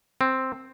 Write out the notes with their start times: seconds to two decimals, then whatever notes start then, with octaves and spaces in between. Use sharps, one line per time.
0.21 C4